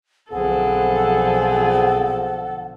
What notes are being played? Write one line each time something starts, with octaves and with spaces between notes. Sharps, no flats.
B1 D3 F3 B3 C4 G#4 A4 F#5